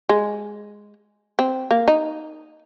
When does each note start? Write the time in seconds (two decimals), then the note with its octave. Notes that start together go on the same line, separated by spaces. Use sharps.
0.09 G#3
1.39 C4
1.71 A#3
1.88 D#4